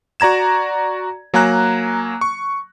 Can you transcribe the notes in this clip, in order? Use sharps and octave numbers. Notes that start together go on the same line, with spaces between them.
F#4 D5 A#5 G#6 E7
F#3 A#3 G#5 A#5 F#6 A#6
C#6